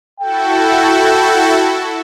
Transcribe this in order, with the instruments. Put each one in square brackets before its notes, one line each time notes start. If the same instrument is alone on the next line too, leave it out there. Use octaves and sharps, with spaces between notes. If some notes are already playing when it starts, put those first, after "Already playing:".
[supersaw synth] E4 F#4 A4 [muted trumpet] G5